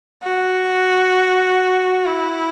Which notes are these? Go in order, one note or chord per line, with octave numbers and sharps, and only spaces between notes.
F#4
E4